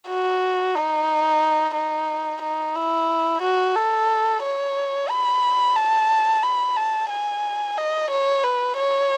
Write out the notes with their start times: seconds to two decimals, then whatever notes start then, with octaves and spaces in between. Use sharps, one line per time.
0.08 F#4
0.75 D#4
1.74 D#4
2.42 D#4
2.75 E4
3.42 F#4
3.76 A4
4.43 C#5
5.10 B5
5.76 A5
6.43 B5
6.77 A5
7.10 G#5
7.77 D#5
8.11 C#5
8.44 B4
8.77 C#5